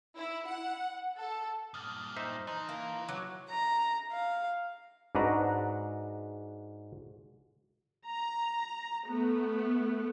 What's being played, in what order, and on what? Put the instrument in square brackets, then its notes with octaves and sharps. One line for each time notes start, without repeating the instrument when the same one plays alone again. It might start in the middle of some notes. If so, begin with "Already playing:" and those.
[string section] E4
F#5
A4
[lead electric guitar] G2 A#2 [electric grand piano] D#6 F6 A6
[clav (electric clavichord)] D#4 C5 E5
[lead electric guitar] E3 [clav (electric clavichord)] D#4 [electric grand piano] A5 A#5 C6
[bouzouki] A#3
[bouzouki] F#3 [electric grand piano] D6
[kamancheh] A#5
F5
[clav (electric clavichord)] G#2 D4 F#4 B4 A#5
[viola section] A#5
A3 B3